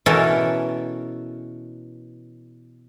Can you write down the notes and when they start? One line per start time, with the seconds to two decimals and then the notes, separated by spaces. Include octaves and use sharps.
0.06 B2 E3 C#4 E4 A4 A#4